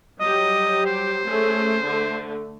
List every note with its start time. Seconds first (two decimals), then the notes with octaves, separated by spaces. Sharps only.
0.20 F#3 G3 G4 D#5
0.86 C5
1.25 A3 C#4 G#4
1.83 D3 A3